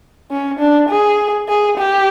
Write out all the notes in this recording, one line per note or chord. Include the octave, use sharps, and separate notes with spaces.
C#4
D4
G#4
G#4
G4